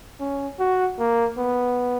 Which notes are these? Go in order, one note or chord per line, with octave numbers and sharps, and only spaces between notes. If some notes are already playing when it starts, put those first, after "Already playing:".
C#4
F#4
A#3
B3